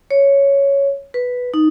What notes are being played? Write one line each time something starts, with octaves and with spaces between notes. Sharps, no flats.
C#5
B4
D#4